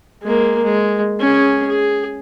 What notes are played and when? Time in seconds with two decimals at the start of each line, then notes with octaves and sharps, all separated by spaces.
0.23 G#3 A#3
0.63 G#3
1.20 C#4 G#4
1.67 G#4